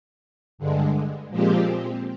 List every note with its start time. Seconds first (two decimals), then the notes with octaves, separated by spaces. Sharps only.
0.58 G2 D3 G#3
1.30 A#2 F3 G#3 C4 G4